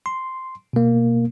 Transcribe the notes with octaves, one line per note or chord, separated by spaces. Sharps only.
C6
B2 A#3